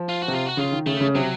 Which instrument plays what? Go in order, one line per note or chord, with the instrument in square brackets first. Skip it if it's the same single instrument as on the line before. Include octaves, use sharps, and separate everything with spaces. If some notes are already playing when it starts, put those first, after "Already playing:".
Already playing: [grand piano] F3
[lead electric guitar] F4
F#4
[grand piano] C3
[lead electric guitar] F4
F#4
[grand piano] C#3 [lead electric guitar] F4
[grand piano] D#3
[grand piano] C#3 [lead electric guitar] A3
[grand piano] C#3
[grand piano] C3 [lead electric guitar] F#3